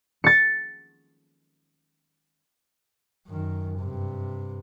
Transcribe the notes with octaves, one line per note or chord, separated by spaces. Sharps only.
A6 C#7
F#2 D#3
G2 C3